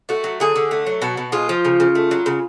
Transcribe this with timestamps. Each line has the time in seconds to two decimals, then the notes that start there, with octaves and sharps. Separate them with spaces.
0.09 A3 F#4
0.24 F#3
0.40 D3 G#4
0.56 D3
0.71 A3
0.87 F#3
1.02 B2 F#4
1.17 B2
1.32 G#3 F4
1.49 F3
1.65 C#3
1.80 C#3
1.95 A3
2.11 F#3
2.26 C#3